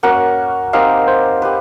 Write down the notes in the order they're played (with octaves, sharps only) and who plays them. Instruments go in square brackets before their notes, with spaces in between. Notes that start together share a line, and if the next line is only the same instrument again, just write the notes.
[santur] A#3 C#4 F#4 A#4 [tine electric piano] F#5
[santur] C4 D#4 G4 A#4 [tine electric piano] F5
[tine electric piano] C5
[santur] G4 B4